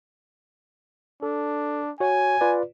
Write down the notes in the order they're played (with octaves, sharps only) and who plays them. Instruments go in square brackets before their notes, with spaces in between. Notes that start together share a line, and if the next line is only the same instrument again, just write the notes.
[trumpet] D4 [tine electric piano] A4
[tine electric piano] F#4 C#5 [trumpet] G#5
[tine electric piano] F4 B4 D5